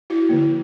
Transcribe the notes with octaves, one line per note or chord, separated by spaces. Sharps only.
E4 F#4
D3 F3 A#3